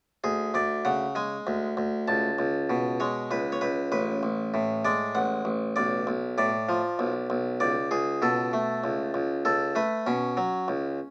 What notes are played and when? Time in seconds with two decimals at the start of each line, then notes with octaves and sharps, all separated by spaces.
0.24 D2 G#4
0.54 D2 D5
0.85 C#3 F#5
1.15 G#3 G#5
1.47 D2
1.77 D2
2.08 C#2 A5
2.39 C#2
2.70 B2
3.00 G#3 C#5
3.31 C#2 B4
3.52 C#5
3.61 C#2 B4
3.92 A1 B4
4.23 A1
4.54 A2
4.85 G#3 D5
5.15 A1 F#5
5.45 A1
5.76 B1 D5
6.07 B1
6.38 A2 D5
6.69 F3
6.99 B1
7.30 B1
7.60 C#2 D5
7.91 C#2 G#4
8.22 B2 A4
8.53 A3
8.84 C#2
9.14 C#2
9.45 C#2 A4
9.75 A3 B4
10.07 B2 C#4
10.37 F#3
10.68 C#2